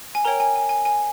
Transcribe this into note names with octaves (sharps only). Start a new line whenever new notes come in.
G#5
A#4 C#5 G5 A#5
G#5
G#5
G#5
G#5